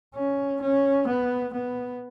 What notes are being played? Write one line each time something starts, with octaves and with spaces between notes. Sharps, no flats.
C#4
C#4
B3
B3